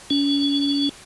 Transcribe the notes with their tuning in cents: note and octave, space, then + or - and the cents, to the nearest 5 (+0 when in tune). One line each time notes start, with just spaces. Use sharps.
C#4 +40